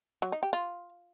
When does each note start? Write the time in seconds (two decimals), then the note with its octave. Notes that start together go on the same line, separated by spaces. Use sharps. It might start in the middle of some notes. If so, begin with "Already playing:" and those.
0.22 F#3
0.32 D#4
0.43 G4
0.53 F4